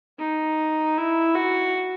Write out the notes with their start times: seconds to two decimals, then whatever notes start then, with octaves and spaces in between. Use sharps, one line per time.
0.19 D#4
0.97 E4
1.35 F#4